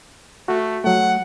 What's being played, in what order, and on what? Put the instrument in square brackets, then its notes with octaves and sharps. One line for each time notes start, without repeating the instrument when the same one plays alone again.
[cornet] A3 [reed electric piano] F#4
[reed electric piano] F#3 A3 [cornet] F#5